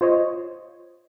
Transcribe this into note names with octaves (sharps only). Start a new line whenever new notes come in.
F4 C5 C#5 D#5